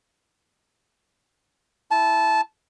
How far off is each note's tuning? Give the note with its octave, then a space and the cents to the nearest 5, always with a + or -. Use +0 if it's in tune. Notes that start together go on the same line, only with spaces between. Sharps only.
E4 +0 A5 -15